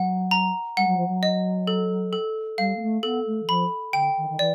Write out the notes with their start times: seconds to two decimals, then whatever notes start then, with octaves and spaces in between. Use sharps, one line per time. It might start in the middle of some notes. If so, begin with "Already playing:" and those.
Already playing: F#3 F#5
0.31 A#5
0.77 G3 F#5
0.86 F#3
0.96 F3
1.07 F#3
1.23 D#5
1.67 A4
2.13 A4
2.58 G3 F5
2.76 A#3
2.81 A3
3.03 B3 A4
3.26 A3
3.42 E3
3.48 F3 B5
3.93 D3 G5
4.17 D#3
4.29 D#3
4.39 E3 D5